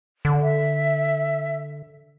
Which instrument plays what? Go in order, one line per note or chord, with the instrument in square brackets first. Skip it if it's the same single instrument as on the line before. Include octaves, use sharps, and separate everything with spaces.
[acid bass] D3
[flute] E5